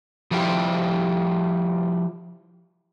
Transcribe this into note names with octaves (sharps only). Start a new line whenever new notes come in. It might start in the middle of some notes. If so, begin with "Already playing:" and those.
F3 G3 E4 F4 G4